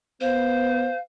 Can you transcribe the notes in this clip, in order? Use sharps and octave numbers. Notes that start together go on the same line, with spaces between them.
B3 C5 F5